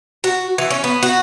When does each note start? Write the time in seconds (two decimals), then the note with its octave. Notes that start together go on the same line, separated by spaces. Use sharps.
0.24 F#4
0.58 E3
0.70 C#4
0.84 B3
1.03 F#4